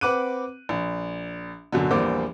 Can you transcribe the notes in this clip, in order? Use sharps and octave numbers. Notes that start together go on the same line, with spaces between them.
C4 B4 F#5 D6 F#6 D#7
A#1
F#2 B2 D3
A#1 E2 G3 A#3 C5 D6